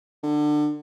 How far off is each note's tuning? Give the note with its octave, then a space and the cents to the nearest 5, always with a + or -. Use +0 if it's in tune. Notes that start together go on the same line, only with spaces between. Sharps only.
D3 +25